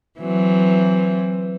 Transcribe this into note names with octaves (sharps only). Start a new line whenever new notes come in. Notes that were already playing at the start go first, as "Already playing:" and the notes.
E3 F#3 C4